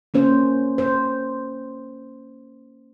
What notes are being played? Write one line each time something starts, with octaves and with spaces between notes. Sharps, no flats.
A#3 C#4 C5
C5